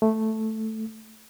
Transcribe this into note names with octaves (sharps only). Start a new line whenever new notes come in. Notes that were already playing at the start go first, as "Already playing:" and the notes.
A3